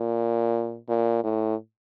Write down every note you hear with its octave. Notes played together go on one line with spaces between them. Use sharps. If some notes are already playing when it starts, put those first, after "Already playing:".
Already playing: A#2
A#2
A2